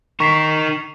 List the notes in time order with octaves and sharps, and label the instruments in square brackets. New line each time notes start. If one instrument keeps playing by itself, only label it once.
[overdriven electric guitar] D#4 A#4 [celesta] C#6 B6 C7